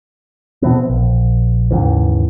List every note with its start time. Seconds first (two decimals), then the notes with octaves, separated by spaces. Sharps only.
0.62 B2 E3 B3 C4
0.90 A#1
1.71 D#2 G#2 C#3 E3